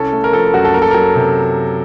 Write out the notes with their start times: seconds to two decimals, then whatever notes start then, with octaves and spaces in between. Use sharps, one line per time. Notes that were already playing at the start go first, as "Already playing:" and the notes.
Already playing: C2 C#4 A4
0.13 A3
0.24 A#4
0.33 F3 A4
0.53 F#2 F#4
0.65 A4
0.74 A#3 A#4
0.82 A4
0.91 F#3 A#4
1.15 C3